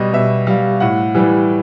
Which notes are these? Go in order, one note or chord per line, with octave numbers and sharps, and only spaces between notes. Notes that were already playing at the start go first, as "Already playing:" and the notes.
Already playing: B2 G3 D#5
B2 E5
G3 F5
A2 F#5
E3 G3